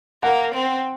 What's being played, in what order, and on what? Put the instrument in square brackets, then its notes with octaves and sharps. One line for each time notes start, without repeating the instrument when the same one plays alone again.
[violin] A#3 [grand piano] F#5
[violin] C4